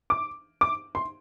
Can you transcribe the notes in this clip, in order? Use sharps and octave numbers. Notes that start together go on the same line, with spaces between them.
D6
D6
C6